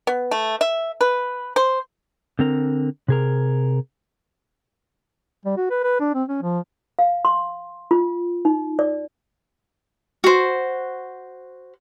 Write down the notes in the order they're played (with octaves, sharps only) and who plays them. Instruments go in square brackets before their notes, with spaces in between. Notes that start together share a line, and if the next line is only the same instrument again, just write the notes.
[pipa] B3
A3
E5
B4
C5
[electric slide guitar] D3 C4 A#4
C3 G#4 A#4
[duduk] G3
F#4
B4
B4
D4
C4
C#4
F3
[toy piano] F5
C6
F4
D#4
D5
[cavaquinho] F#4 C5